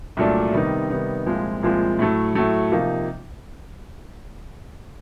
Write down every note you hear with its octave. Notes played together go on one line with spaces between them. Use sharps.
C2 A#2 F#3 A3 D4
C3 D#3 G3 B3 D#4
C3 D#3 G3 B3 D#4
C2 A#2 F3 G#3 C4
C2 A#2 F3 G#3 C4
A2 F#3 A3
A2 F#3 A3
C3 F3 A#3 D#4